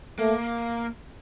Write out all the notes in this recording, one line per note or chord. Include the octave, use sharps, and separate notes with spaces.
A3 A#3